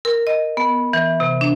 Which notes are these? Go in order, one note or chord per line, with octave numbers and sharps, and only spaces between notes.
A#4
D#5
B3
E3
C3
D4